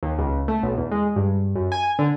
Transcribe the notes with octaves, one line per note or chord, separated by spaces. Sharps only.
D#2
C#2
A3
B1
E2
G#3
G2
F#2
G#5
D3